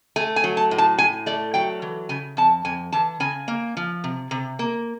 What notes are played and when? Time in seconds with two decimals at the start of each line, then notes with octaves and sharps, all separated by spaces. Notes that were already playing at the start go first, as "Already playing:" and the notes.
0.16 A3 G#5
0.36 G#5
0.44 F#3
0.57 A5
0.71 A2
0.78 A5
0.98 A2 G#5
1.26 A3 D5
1.54 F#3 G5
1.82 E3
2.09 C#3 G#5
2.37 F2 A5
2.65 F2 G#5
2.92 E3 A5
3.20 C#3 G#5
3.48 A#3
3.77 F3
4.04 C3
4.31 C3
4.59 A#3